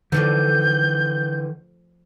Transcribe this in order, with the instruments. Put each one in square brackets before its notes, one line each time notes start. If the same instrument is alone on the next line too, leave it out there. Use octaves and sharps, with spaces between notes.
[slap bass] D3 E3 [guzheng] F3 A3 D5 [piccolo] G6